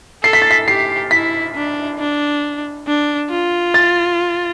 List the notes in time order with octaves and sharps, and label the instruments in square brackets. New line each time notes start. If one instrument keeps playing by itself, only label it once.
[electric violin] A4 [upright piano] C7
[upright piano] B6
A6
B6
[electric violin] G4 [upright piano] C7
[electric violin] E4 [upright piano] B6
[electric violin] D4
D4
D4
F4
[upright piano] A6